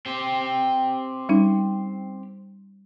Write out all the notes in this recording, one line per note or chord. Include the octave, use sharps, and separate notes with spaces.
C4 G4
G3 C#4 D#4